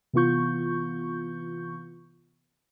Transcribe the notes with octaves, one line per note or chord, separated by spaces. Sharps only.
C3 E3 B3 F4 C#6 G6